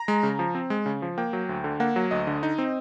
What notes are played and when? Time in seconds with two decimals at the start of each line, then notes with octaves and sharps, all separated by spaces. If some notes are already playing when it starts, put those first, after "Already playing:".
Already playing: A#5
0.08 G#3
0.23 C#3
0.39 F3
0.55 C4
0.70 G#3
0.86 C#3
1.02 F3
1.18 A#3 G5
1.33 F#3
1.49 D2
1.64 D3
1.80 A#3 F#5
1.96 F#3
2.11 D2 D#5
2.27 D3
2.43 D#4
2.58 C4